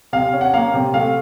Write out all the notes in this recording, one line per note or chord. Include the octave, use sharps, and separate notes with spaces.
C3 F5
C#4
F#5
A#3 F5
C3
A3 F5